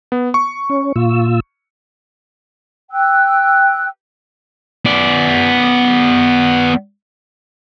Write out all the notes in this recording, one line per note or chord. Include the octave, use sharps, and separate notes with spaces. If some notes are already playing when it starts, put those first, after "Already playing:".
B3
C#6
C#4
A#2 F4 E6
G5 E6 F#6
B3 D5